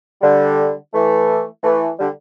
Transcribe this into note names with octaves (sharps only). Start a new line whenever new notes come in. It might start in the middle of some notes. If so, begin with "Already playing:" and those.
D3 G3
E3 A3
E3 A3
D3 G3